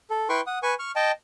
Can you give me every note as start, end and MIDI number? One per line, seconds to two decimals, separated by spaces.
0.10 0.28 69
0.29 0.41 64
0.29 0.41 71
0.29 0.41 79
0.29 0.41 84
0.29 0.41 85
0.47 0.59 78
0.47 0.59 87
0.63 0.75 71
0.63 0.75 80
0.63 0.75 85
0.79 0.92 85
0.79 0.92 89
0.96 1.11 75
0.96 1.11 79
0.96 1.11 81